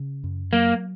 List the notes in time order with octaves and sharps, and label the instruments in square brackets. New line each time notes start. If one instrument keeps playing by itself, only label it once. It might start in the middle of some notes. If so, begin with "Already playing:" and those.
Already playing: [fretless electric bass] C#3 C#4
F#2
[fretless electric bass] F#3 [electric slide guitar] A#3